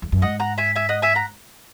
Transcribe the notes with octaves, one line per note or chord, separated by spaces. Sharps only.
E2
F#2
G#2 D#5 F#5
F#5 A#5
E5 G#5
E5 G#5
D#5 F#5
E5 G#5
F#5 A#5